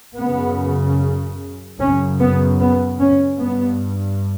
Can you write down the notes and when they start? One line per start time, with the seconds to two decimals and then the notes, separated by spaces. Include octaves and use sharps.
0.18 F#2 C#3 B3
1.79 F#2 C#3 C#4
2.19 B3
2.60 B3
3.00 C#4
3.39 G2 B3